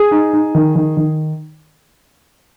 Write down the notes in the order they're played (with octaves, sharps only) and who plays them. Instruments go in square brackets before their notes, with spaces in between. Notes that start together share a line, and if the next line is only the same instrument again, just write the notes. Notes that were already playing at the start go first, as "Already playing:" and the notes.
Already playing: [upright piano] G#4
D#4
D#4
D#3
D#3
D#3